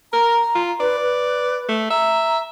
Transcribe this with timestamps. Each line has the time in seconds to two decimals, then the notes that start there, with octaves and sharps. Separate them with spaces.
0.13 A#4 A#5
0.55 F4
0.80 B4 D5
1.01 B4
1.69 A3
1.91 E5 A#5